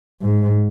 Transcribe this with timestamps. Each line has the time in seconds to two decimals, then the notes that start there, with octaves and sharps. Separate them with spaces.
0.22 G#2